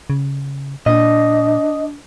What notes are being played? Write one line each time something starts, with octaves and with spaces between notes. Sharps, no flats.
C#3
A#2 D4 D#5